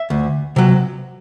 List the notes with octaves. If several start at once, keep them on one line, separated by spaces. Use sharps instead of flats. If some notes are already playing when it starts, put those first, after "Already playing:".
Already playing: E5
D2
C3 F#3